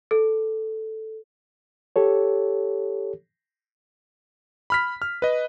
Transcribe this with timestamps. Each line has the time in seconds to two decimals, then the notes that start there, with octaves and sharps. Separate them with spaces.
0.11 A4
1.96 G4 A4 C#5
4.70 B5 F6 B6
5.02 F6
5.22 B4 D#5